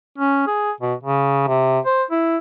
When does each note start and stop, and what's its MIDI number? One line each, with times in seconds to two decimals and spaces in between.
0.18 0.42 61
0.47 0.71 68
0.80 0.94 47
1.03 1.47 49
1.47 1.79 48
1.86 2.04 72
2.11 2.37 64